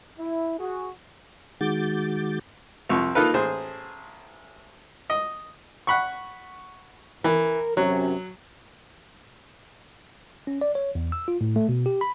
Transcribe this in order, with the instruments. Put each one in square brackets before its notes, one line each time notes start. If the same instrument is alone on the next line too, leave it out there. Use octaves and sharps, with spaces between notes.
[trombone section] E4
F#4 G#4
[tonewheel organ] D#3 G#3 F#4 D6 G6 A6
[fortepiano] C2 F2 C#6
A#3 D#4 F4 A4 B4
A1 G#4 C5
D#5
F#5 B5 C#6
[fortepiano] E3 [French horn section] A#4
[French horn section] F#2 C3 C#4 [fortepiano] F#3
[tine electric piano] C#4
D5
C#5
E2
E6
F4
A2
A3
B2
G4
B5